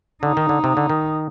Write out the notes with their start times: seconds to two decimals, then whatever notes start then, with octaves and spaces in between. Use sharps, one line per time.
0.23 D3 D#4
0.37 D#3
0.49 D3
0.64 C3
0.77 D3
0.90 D#3